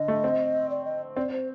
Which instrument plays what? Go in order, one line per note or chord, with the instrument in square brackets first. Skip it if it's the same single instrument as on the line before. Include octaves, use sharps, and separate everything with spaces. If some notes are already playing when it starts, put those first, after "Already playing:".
Already playing: [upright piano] D3 [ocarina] D#5
[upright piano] A3
C4
[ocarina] D5
D#5
[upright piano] C4 [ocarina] D5
[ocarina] C5